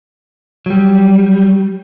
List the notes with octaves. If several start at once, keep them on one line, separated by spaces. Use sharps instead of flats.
F#3 G3